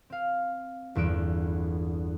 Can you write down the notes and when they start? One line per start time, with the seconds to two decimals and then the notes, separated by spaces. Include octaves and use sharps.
0.10 C4 F5
0.95 G1 E2 E6 D7